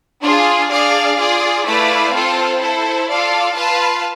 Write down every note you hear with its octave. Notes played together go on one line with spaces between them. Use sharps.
D4 F4 G#4
D4 G#4 D5 F5
F4 G#4 D5
A3 E4 B4 D5 F5
C4 F4 A4 C5
E4 A4 C5
F4 A4 D5 F5
F4 B4 F5 A5